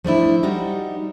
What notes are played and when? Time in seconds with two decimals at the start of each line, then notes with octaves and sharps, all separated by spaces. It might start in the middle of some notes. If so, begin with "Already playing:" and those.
0.04 F3 A3 D4 E4
0.43 G3 D#4 F#4 G4